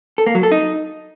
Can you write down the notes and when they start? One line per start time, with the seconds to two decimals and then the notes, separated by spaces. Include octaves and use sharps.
0.18 A4
0.26 A#3
0.35 F#3
0.43 A4
0.52 D#4